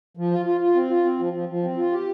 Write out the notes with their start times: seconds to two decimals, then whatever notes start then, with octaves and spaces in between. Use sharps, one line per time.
0.17 F3
0.31 F4
0.46 F4
0.61 F4
0.75 C4
0.90 F4
1.04 C4
1.19 F3
1.33 F3
1.49 F3
1.63 C4
1.77 F4
1.92 G4